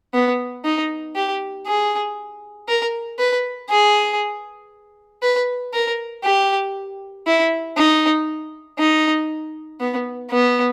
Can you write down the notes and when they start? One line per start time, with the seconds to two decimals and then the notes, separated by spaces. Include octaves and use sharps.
0.14 B3
0.65 D#4
1.16 G4
1.67 G#4
2.68 A#4
3.19 B4
3.70 G#4
5.23 B4
5.74 A#4
6.24 G4
7.27 E4
7.77 D#4
8.79 D#4
9.80 B3
10.31 B3